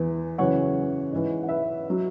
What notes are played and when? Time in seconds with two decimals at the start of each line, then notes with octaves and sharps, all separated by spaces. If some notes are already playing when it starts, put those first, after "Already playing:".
Already playing: E2 E3
0.38 F#2 C#3 E3 C#5 F#5
1.12 G#2 E3
1.43 F#5
1.49 B4 E5
1.90 F#3